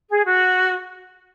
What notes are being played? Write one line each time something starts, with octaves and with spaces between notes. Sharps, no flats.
G#4
F#4